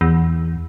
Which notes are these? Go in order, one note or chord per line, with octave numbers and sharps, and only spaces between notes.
E2